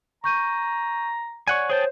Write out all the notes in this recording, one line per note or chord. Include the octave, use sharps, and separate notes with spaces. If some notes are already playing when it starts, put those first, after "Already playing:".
A#5 C#6 G6 D#7
C#5 D5 F#5 G#5
G#4 C5 C#5 G5 A5